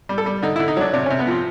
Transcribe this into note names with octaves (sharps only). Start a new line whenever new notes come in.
G3
A4
G3
D3 D#4
E4
D3
D#4
F#3 D4
C3 D4
C#4
C3
B3
F3 C4